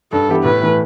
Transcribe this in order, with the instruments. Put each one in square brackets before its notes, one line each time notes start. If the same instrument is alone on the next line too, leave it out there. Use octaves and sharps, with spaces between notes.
[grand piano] G2 [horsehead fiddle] A4
[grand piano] E3 B3 E4 G4
[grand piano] A2 [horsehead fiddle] B4
[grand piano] E3 A3